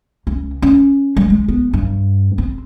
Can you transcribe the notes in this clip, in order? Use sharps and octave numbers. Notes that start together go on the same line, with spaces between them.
C#2
C#4
G3
G#3
B3
G2
C4